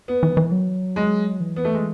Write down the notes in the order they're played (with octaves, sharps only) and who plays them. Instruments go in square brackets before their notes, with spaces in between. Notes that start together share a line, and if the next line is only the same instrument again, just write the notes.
[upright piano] B3
[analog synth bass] E3
E3
F#3
[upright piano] G#3
[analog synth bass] E3
[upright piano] B3
A3
G#3